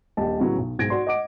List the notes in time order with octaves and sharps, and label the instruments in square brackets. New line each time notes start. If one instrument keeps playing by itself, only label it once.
[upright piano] D#1 A#1 G4 D#5 A5
A2 C#3 F#3 B3
B1
B1 G#2 G#6 A#6 D7
F#4 D5 C6
D#5 F#5 D6 D7